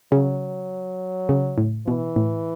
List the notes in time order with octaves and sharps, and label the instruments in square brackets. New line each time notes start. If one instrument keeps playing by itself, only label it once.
[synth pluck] C#3 [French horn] F#3
[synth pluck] C#3
A2
[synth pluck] B2 [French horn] E3
[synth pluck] A2